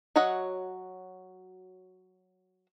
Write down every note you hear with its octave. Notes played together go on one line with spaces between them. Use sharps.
F#3 F#4 C#5 D#5 F#5